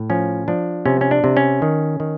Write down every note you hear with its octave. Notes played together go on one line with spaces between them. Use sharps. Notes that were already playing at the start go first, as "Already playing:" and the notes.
Already playing: A2
F3 C#4
F3 D4
C3 C#4
C#4
D4
C3
C#4
D#3
D#3